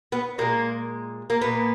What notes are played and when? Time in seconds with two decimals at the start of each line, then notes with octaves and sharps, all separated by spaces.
0.12 B3
0.38 A#2 G#3 A#3
1.30 A#3
1.42 A#2 A#3 B3